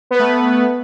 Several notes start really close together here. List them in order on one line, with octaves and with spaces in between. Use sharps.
B3 B4 A3